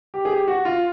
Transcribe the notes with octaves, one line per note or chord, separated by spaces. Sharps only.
G4
G#4
G4
F#4
F4